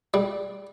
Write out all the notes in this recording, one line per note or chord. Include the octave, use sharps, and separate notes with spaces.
G3